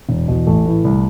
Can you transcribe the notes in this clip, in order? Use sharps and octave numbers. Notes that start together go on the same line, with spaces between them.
E1
E2 B2
A1 A3
A2 E3
C2